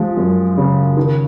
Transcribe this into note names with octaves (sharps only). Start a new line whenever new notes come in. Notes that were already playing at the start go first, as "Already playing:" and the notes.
Already playing: F3 G#3
F#2
C#3
D#3